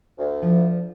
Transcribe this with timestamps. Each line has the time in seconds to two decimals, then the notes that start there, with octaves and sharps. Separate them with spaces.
0.18 D2
0.42 F3